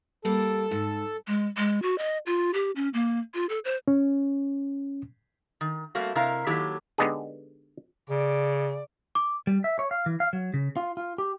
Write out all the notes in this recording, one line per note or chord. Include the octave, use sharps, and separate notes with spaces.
G3 A#3 A4
G#2
G#3
G#3
F#4
D#5
F4
G4
C#4
A#3
F4
A4
C5
C#4
D#3
G3 A3 A#3 C4 F#4 F5
C3 E4 A#4 D#5 F5 A#5
D#3 F#3 A#3 E4 G4 A4
D3 G#3 B3 D#4 G4 G#4
C#3 D5
D6
G3
E5
C#5
F5
E3
F5
F#3
C#3
F4
F4
G4